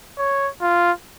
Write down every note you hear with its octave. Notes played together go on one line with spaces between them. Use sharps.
C#5
F4